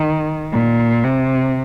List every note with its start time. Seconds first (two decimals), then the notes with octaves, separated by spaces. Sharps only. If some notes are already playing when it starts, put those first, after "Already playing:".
Already playing: D#3
0.53 A#2
1.04 C3